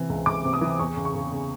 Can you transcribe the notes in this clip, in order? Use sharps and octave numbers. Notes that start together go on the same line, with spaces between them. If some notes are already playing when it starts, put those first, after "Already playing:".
Already playing: C3 E3
C#2
C#2 D6
C3
D#6
E3
E2 C#6
C#3
C#6
C#3
C#3